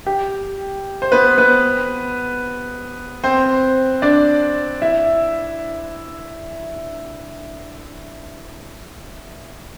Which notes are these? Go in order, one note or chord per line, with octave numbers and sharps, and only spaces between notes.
G4
C5
B3 B4
B3 B4
C4 C5
D4 D5
E4 E5